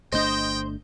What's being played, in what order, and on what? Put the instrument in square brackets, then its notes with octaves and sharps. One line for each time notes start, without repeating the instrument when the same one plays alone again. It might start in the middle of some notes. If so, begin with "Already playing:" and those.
[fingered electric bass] G1 A3 D4 [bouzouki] C5 [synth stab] D#5 G6 [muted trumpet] G5